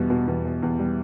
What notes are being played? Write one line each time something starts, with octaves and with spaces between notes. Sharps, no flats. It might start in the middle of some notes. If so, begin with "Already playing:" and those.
Already playing: E2 B2 G3
B2
E2
B2
E2
G3